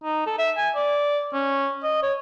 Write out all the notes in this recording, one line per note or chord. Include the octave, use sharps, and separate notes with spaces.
D#4
A4
E5
G#5
D5
C#4
D#5
C#5